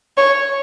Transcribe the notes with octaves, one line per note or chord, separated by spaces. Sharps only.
C#5